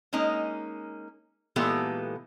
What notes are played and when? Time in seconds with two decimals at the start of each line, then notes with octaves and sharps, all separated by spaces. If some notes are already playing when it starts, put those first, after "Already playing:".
0.13 G#3 A#3 C#4 D#4
1.56 A#2 E3 G#3 B3 G4 A4